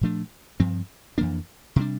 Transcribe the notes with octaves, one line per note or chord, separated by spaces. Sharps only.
A#2 F3 A3 D4
G2 F3 C4
F2 E3 A#3 D4
C3 G3 D4